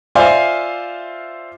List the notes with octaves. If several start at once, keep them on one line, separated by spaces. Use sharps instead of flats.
F4 C5 D5 E5 F5 G#5